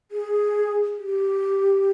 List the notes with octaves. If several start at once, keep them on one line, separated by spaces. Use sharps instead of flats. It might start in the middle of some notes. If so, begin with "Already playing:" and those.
G#4
G4